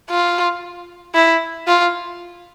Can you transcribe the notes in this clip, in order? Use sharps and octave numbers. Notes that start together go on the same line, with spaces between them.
F4
E4
F4